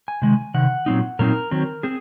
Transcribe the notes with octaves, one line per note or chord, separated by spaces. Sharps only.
G#5
C3 D#3 G#3
C3 D#3 F#5
A#2 F#3 C4 D#4
A#2 F#3 C4 D#4 A#4
D#3 F#3 C4
C4 G#4